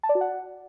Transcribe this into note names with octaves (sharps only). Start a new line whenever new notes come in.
A5
D5
F#4
F#5